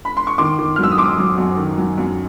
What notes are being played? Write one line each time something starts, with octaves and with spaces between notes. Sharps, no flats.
B5
C6
C#6
D#3 C6 D6
D#3
F6
F#3 E6
D#6
F#2 C6 D6
F#3
F#2
D#3
F#3
F#2